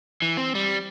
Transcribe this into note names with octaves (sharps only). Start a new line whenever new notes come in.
E3
C4
G3